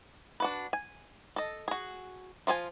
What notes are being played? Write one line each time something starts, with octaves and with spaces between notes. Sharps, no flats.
D4 F#4 B4
G#5
A4 D#5
F#4 G#4
F3 F4 G#4 G#5